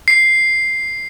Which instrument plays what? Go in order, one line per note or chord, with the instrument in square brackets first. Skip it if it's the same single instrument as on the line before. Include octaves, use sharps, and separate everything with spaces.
[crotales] C7